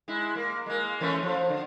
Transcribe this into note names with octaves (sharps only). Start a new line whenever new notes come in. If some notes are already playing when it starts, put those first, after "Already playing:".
G#3 E4
A#3
G#3 A#3
E3 A3 C#4
F3
D3